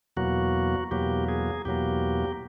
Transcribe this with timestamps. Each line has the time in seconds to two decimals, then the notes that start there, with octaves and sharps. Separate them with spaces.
0.17 E2 B2 F#3 A#3 F#4
0.91 E2 B2 F#3 A#3 G4
1.28 G#4
1.65 E2 B2 F#3 A#3 G4